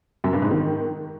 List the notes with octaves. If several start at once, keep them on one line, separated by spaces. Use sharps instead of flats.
F#2
G2
G#2
D#3